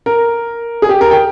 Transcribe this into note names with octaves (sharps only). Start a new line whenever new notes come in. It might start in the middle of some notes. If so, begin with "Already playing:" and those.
A#4
G#4
G4
A#4
G5